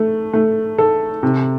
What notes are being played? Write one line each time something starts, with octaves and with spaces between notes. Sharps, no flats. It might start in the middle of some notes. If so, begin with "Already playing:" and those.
Already playing: A3
A3
A4
C3